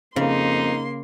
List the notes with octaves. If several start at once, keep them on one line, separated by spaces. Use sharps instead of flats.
F2 C#3 A#3 D#4 C6